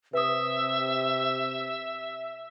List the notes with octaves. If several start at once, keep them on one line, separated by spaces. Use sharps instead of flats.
C3 B4 E5 D#6